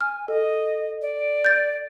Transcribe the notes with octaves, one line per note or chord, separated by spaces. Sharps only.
G#5 F6
A4 D#5
D5
G6 A6